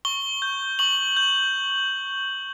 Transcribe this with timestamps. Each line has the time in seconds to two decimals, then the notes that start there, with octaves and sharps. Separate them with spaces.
0.05 C#6 G7
0.42 G6
0.79 C#6 F#7
1.17 G6